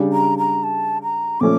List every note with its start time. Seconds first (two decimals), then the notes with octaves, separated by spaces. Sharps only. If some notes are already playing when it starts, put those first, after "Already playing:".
Already playing: C#3 G3 D4
0.13 A#5
0.38 A#5
0.64 A5
1.03 A#5
1.40 A#2 F3 A3 C#4 D6